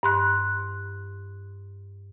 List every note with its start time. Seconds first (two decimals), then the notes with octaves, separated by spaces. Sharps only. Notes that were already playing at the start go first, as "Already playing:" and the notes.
0.03 G2 C6 F#6